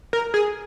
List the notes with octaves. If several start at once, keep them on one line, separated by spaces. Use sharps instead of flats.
A#4
G#4